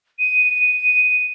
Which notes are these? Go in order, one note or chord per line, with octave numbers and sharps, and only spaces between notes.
D#7